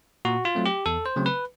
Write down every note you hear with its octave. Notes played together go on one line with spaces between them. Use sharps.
A#2 F#4
F4
F#3 A3 C4
G4
E2 A4
C5
C#3 F#3 A3 C4
B4